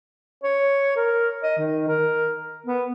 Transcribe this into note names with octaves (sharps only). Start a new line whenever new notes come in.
C#5
A#4
D#5
D#3
A#4
B3